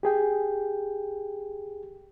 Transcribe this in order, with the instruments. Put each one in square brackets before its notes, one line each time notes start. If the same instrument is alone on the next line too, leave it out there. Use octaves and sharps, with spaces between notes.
[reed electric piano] G4 G#4 G5